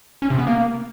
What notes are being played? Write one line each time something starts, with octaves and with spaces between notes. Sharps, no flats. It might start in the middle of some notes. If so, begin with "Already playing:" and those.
C#4
C3
B3
A#3